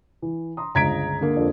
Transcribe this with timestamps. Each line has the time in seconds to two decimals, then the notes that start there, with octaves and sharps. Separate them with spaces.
0.22 E3
0.57 A#5 C6 D#6
0.75 G1 C#2 A#5 G#6 B6 D7
1.21 D3 A#3
1.36 F2 D4 A4